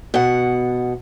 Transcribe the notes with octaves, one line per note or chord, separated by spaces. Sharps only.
B2 F#5